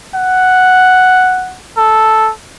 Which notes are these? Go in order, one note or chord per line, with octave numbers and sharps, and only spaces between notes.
F#5
A4